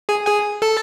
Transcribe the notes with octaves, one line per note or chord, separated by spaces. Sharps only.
G#4 G#5
G#4 G#5
A4 A5